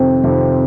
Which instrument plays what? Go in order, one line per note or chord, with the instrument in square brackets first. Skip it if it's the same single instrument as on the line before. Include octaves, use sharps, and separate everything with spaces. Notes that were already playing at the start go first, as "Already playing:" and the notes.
Already playing: [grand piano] F2 C3 D#3 [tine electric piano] C4
[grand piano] F2 C3 D#3